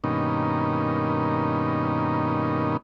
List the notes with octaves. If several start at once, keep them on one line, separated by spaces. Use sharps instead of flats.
G2 B2 D#3 A#3 C#4 D#4